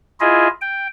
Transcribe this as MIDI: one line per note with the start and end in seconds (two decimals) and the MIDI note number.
0.20 0.48 64
0.20 0.48 65
0.20 0.48 68
0.20 0.48 75
0.61 0.87 79